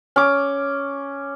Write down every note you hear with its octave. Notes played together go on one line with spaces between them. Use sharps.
C#4 D6